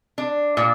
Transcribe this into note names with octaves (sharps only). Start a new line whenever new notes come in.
D4
A#2